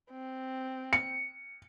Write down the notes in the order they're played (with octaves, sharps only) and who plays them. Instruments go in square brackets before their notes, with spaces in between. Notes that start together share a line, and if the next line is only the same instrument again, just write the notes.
[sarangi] C4
[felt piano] C#7